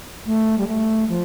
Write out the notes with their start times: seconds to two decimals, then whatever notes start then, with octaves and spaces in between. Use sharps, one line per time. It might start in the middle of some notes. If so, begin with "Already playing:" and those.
0.26 A3
0.58 G3
0.67 A3
1.09 F3